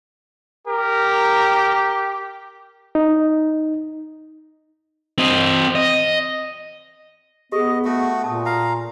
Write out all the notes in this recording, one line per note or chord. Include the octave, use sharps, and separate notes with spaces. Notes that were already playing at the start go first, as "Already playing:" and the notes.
G4 A#4
D#4
C4 D#5
D#5
B3 G4 G#4 D#5
A3 F#4
A#2 A5 D#6
F5 A#5